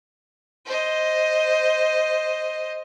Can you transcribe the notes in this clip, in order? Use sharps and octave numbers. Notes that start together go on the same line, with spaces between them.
C5 D#5